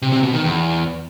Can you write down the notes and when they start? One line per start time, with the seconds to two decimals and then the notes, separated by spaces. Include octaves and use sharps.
0.02 C3
0.13 C3
0.23 B2
0.33 D#3
0.43 E2